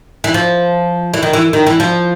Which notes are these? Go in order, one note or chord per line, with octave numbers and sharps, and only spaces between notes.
E3
F3
E3
D#3
E3
D#3
E3
F3